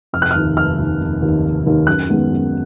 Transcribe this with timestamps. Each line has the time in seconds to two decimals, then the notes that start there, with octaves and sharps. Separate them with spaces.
0.13 F1 F6
0.22 F#6
0.31 F6
0.36 D#2 D#3
0.57 F1 F6
0.79 D#2 D#3
1.01 F1
1.22 D#2 D#3
1.44 F1
1.66 D#2 D#3
1.87 F#2 F#6
2.09 D#3 G#3 B3
2.30 F#2